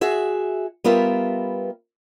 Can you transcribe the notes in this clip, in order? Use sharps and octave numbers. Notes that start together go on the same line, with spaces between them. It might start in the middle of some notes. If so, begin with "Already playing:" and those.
F#4 G#4 E5
G3 B3 F4 A#4 E5